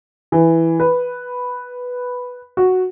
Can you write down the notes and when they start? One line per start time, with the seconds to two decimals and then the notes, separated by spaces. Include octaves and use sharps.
0.32 E3
0.80 B4
2.57 F#4